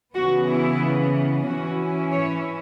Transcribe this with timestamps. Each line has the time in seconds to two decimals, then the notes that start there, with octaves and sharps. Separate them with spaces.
0.15 C#3 E3 B3 F#4
0.47 E4
1.46 E3 C#4 E4 F#4
2.12 C#5